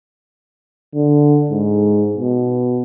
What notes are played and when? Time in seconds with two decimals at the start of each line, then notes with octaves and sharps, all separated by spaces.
0.95 D3
1.50 G#2
2.16 B2